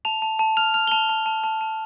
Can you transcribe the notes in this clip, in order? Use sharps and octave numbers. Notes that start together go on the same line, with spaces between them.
A5 F7
A5
A5
F6 F7
F6 F7
G7
A5 F7
A5
A5
A5
A5